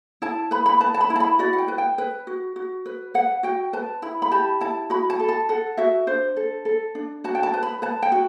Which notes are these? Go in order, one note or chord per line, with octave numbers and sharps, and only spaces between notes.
E4 A5
B4 B5
B5
B4 A5
A5
B5
E4
A5
B5
F#4 D5
F#5
G5
B4
G5
B4
F#4
F#4
B4
B4 F#5
F#4 G5
B4 A5
E4 B5
B5
G4 A5
E4 A5
F#4 B5
A5
A4
A5
A4 F#5
F#4 E5
D4 C5
A4
A4
D4
F#4 A5
G5
A5
B4
B5
B4 A5
G5
F#4